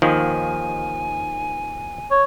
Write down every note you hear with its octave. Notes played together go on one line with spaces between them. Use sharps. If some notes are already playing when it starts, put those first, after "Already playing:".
D#2 D#3 F3 G#5
C#5